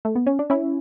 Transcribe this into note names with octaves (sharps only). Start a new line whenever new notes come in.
A3
B3
C#4
D4
C#4 E4